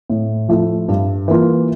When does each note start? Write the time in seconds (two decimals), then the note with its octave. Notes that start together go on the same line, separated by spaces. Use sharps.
0.10 A2
0.48 F3 A3 E4
0.88 G2
1.28 E3 A#3 F4